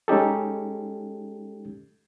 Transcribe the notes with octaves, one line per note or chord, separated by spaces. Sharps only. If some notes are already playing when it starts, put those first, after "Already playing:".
G#3 C#4 D#4 G4 A4